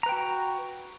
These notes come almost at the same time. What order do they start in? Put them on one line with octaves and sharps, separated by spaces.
A#5 B4 G5 F#4